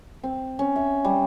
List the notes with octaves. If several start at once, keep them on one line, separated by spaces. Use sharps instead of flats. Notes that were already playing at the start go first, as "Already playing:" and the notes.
C4
C#4
E5
G3